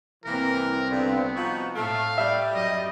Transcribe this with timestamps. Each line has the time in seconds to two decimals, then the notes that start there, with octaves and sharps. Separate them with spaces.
0.25 C2 E3 A#3 C4 A#4
0.90 G2 D3 B3
1.36 F3 D#4 F#4
1.75 A2 A3 F5
2.18 G3 E5
2.54 F#2 D#5